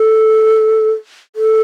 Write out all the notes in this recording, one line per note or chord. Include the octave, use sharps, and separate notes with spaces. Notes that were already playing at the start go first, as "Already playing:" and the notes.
Already playing: A4
A4